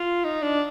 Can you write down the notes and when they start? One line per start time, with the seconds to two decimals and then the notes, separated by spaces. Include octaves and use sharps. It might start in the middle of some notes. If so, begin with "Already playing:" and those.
Already playing: F4
0.24 D#4
0.42 D4